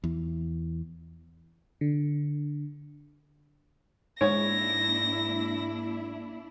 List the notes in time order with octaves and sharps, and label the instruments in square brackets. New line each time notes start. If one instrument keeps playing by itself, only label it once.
[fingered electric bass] E2 E3
[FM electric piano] D3
[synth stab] G#2 [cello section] A#3 D4 E4 [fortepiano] C#5 [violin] A#6